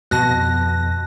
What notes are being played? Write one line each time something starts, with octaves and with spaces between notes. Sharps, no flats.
F2 B2 B3 A5 F#6 A#6